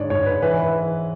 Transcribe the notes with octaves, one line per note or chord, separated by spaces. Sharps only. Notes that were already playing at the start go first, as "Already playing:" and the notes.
Already playing: G#2 D3 C#5 D5
G#2 C#5
B4
E3 B4